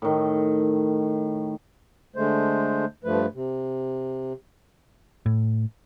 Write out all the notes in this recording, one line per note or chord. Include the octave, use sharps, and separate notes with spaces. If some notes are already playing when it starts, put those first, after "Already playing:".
A2 D#3
D3 G#3 A3 C5
G2 F3 A3 B4
C3
A2